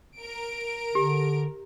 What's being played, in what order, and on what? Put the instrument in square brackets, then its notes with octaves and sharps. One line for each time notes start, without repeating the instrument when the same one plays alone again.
[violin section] A#4 D7
[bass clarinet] D3 [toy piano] G4